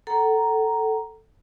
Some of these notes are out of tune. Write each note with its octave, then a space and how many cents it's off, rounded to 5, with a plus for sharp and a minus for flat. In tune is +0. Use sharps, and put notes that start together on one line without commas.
A4 +0 F#5 +40 A#5 +0